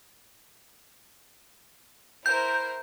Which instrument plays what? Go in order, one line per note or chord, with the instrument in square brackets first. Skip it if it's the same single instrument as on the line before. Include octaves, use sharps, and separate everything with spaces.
[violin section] E4 A#4 C5 [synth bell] G6